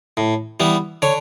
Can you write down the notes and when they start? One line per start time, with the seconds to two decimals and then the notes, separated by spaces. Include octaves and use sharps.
0.17 A2
0.60 E3 G3 B3
1.02 D3 C#5